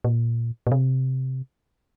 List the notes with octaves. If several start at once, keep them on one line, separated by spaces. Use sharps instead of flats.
A#2
A#2
C3